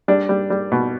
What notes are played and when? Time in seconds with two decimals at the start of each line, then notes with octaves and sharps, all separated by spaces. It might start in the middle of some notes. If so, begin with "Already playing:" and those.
0.08 G3 D4
0.29 G3
0.50 G3
0.72 B2